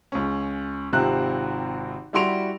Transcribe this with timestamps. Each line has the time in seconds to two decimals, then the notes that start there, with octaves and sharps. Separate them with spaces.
0.12 C#2 C#4
0.93 G#1 C3 C4 F4 F#6
2.13 G3 E4 F#4 C6 D7 F7